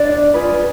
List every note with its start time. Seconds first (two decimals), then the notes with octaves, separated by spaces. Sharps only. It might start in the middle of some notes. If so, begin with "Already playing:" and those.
Already playing: D4 D5
0.34 F4 G#4 B4